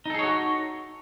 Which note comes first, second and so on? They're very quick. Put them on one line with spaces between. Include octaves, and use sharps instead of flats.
D#4 A4 G#4 C#5 F#4